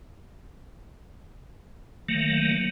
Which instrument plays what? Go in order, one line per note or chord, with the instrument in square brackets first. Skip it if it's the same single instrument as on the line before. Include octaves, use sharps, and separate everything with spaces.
[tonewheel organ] D#3 F#3 A3 A#3